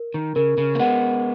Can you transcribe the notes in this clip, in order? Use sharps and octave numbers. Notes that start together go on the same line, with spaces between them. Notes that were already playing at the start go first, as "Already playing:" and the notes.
Already playing: A#4
D#3
C#3 A#4
C#3
A#3
G#3 B3 F#5